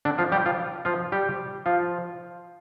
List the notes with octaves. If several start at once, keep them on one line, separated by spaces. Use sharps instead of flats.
D3 D4
F3 F4
G3 G4
F3 F4
F3 F4
G3 G4
F3 F4